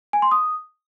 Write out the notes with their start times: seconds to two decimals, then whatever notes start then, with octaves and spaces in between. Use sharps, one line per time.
0.13 G#5
0.22 C6
0.31 D#6